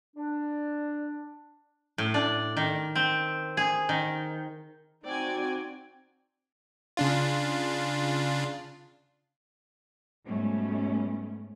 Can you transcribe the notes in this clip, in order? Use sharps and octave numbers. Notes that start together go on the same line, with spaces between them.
D4
A2
D4
D#3
C4
G#4
D#3
C4 D#4 F#4 D5 G5 G#5
C#3 D4 F4
G#2 B2 G3 A3 C#4